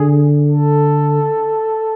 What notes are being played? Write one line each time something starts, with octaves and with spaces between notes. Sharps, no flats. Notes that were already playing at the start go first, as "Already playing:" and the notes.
Already playing: D3 G#4
A4